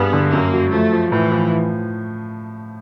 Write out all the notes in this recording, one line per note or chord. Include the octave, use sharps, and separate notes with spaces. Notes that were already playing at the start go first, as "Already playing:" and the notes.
Already playing: G2 B3 G#4
D3
F#2 A#3
F#3
F3 A3
F3
A2 E3
F3